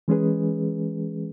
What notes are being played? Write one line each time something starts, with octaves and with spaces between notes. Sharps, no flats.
E3 G#3 C#4 G#4 B4